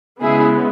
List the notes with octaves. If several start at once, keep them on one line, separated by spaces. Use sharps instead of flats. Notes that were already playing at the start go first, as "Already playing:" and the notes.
C#3 G#3 B3 E4 G#4